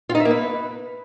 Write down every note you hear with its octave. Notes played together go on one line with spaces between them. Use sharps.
F4
D#4
E5
A#3
B4